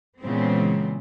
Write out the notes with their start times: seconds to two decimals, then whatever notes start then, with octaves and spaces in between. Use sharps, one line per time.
0.22 A#2 C#3 E3 G#3 B3 C4